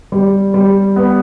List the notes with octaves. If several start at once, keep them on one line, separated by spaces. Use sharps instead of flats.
G3
G3
B3